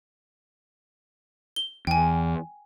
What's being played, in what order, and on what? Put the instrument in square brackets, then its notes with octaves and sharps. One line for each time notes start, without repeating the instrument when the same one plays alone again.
[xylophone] G7
[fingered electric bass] E2 [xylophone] G5 G#5